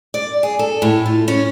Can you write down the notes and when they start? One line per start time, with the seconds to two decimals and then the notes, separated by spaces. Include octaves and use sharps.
0.14 D5
0.43 G#4
0.59 A4
0.82 A2
1.06 F4
1.28 C#4